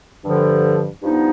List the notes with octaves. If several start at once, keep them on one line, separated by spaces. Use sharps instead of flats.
G2 D3 F3
G2 F3 B3 D#4